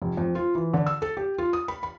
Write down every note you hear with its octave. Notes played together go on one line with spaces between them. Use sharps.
F1
F2
F4
E3
D3
E6
A4
G4
F4
D#6
B5
B5